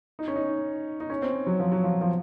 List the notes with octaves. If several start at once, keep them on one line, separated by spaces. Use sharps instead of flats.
D#4
C#4
D#4
D#4
C#4
C4
F#3
F3
F#3
F3
F3